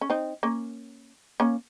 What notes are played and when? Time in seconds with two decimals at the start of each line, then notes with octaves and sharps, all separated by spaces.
0.01 C#4
0.10 C4 D#4
0.43 A#3 C#4
1.40 A#3 C#4